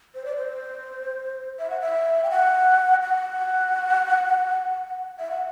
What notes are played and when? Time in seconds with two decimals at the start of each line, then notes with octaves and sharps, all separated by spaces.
0.15 C5
0.26 D5
0.36 C5
1.59 E5
1.70 F#5
1.81 E5
2.24 G5
2.30 F#5
3.02 F#5
5.19 E5
5.31 F#5